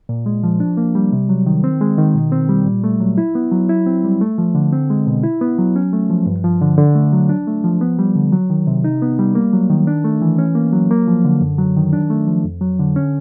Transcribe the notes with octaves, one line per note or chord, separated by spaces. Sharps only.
A#2
G#3
F3
D4
A#3
G3
C3
F#3
D#3
C4
G#3
D#3
B2
C4
G3
A#2
A3
F#3
E4
B3
F#3
E4
C4
G3
A3
F3
D3
C4
G#3
B2
E4
B3
F#3
C#4
A3
F3
G2
F3
D3
D3
A3
F#3
D4
A3
F3
B3
G3
D3
F#3
D#3
C3
D#4
B3
G3
A#3
F#3
D#3
D4
A3
E3
C#4
A#3
F#3
A#3
F3
D3
F#2
F#3
D#3
D4
A3
F3
F2
F#3
D3
C#4